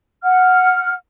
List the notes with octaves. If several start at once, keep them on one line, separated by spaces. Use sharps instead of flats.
F#5 F6